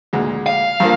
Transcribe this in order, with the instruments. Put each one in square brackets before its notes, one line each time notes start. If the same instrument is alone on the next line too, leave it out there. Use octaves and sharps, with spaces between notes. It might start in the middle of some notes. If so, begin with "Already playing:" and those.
[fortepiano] D2 A#2 G#3
[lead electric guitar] F5
[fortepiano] G2 F3 A#3